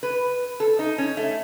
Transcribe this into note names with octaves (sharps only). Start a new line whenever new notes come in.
B4
A4
D#4
C#4
A3